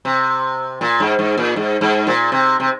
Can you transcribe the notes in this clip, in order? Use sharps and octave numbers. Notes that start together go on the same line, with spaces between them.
C3
A#2
G#2
G#2
A#2
G#2
G#2
A#2
C3
C3